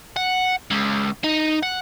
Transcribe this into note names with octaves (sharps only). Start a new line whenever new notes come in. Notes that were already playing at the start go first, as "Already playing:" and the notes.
F#5
C#2
D#4
F#5